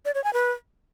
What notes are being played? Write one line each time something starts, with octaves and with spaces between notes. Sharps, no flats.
D5
C#5
G#5
B4